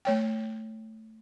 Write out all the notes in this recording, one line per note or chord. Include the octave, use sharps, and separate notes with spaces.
A3 C#5 G5